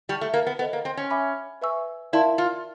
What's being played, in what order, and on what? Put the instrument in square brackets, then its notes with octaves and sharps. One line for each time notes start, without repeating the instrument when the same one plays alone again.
[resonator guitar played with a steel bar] G3 [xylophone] D5 F#5 A5 C#6 F6
[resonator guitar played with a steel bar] A3
A#3
B3
[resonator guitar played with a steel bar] B3 [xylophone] A4 C5 D#5
[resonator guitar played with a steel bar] A#3
C4
C#4
[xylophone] E5 G#5 B5 D6
B4 E5 G#5 C#6 E6
[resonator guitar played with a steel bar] E4 [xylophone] A#4 D5 F5 A5 C6
[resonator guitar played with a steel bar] F4